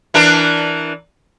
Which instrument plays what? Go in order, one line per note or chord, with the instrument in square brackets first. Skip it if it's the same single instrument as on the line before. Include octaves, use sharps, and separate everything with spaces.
[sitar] E3 D4 A#4